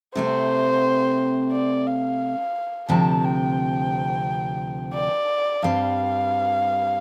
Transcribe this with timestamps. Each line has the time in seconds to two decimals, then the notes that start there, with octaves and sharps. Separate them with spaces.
0.15 C3 A3 C4 C5
1.52 D5
1.87 F5
2.89 D2 C3 F3 C4 A5
3.24 G5
4.94 D5
5.62 G2 G3 C4 F5